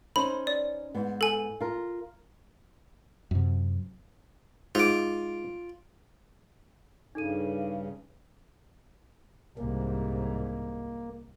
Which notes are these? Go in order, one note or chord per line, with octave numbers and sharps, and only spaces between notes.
C#4 D#4 C5 B5
D5
G#2 B3
A4 G#5
F4 A#4
F#2 C3
G#2 F4 D6
G2 C#3 D#4 A4 D#7
C2 G#2 A#3